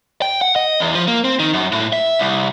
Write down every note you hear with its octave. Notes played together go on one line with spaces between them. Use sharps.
G5
F#5
D#5
E2
F3
A#3
C4
D#3
F#2
A2
E5
C2